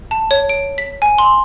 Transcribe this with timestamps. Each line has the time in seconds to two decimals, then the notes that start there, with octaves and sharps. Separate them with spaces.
0.11 A5
0.31 C#5
0.49 D7
0.78 B6
1.02 G#5
1.18 C6